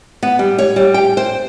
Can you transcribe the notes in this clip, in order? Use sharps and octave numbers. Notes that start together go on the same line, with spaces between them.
B3
G3
C#5
G3
G5
C5